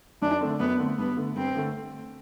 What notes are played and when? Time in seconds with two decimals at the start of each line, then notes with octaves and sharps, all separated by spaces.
0.22 F#2 D4
0.41 D3 A3 C4
0.60 F#2 B3
0.79 D3 A3 C4
0.98 G2 B3
1.17 D3 A3
1.36 G2 C4
1.55 D3 A3